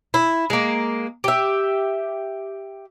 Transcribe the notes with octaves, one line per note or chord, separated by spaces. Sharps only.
E4
G#3 A#3
G4 E5